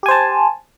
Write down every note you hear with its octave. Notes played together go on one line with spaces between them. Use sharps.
G4 C5 G#5 A5